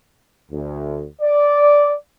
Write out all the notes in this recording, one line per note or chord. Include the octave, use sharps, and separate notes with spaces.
D2
D5